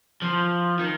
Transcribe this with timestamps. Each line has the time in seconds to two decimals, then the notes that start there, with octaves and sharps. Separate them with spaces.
0.22 F3
0.79 D#3